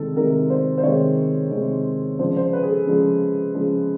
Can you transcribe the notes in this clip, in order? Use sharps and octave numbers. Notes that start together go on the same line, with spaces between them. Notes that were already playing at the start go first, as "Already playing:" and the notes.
Already playing: C3 D#3 G#3 A4
C3 D#3 G#3 A#4
C5
C5
C3 D#3 G#3 C#5
C3 D#3 G#3
C#3 F3 G#3 C5
C5
B4
G#4
A4
C#3 F3 G#3
C#3 F3 G#3